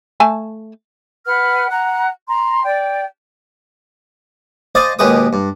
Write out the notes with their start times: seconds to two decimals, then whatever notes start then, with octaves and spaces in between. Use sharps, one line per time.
0.20 A3 G#5 A5
1.26 B4 F#5 F6
1.69 F#5 A#5 F#6
2.28 A#5 C6
2.63 D5 G5
4.75 C5 D5 D#5 F5 G#5 A5
4.99 D#2 B2 G#3 G4 B4 D#6
5.33 G2